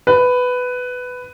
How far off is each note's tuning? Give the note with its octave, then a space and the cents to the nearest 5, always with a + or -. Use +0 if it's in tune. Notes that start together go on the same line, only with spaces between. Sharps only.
B4 +10